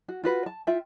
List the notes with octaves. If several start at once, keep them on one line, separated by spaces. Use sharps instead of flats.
F#4
F4 F#4 B4
A5
F4 E5 G5